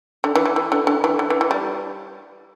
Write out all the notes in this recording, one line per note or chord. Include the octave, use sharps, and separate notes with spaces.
D3
E3
E3
E3
D3
D3
E3
D3
E3
E3
G3